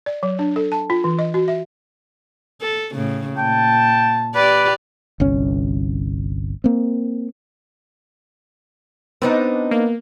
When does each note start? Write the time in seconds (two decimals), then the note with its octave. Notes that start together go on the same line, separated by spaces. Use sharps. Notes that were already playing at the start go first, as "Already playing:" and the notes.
0.06 D5
0.23 F#3
0.39 D4
0.56 A4
0.72 A5
0.90 F4
1.04 E3
1.19 D#5
1.34 F#4
1.48 E5
2.61 A4
2.94 A2 C#3
3.37 A#2 G5 A5
4.35 G4 B4 D5
5.20 G1 C2 C#4
6.64 A#3 C4
9.22 B3 C4 D4 D#4
9.71 A#3